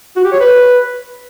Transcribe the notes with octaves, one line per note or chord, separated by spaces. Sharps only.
F#4
G4
C#5
B4